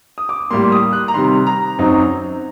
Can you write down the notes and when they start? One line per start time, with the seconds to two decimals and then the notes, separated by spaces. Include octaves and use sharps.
0.18 D#6
0.29 D6
0.51 A2 G3 A#3 C6
0.72 D#6
0.93 F#6
1.08 A#5
1.14 C3 D#3 G3 C6
1.47 A#5
1.79 F#2 F#3 C4 D#4